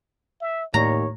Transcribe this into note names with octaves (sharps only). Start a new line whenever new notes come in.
E5
D#2 A2 C#5 A#5